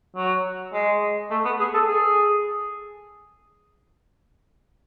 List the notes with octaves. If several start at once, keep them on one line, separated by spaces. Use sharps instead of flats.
F#3
G#3
A3
B3
G#4
A4
G#4